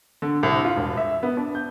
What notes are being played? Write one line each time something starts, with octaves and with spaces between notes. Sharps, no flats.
D3
C2
F4
E1
E5
B3
D4
G6